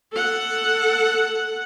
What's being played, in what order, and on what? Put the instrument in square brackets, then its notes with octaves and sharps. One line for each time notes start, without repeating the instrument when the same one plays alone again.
[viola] A4 F#5